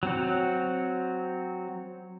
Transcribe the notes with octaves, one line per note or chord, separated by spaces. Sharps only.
F#3 C4 F#4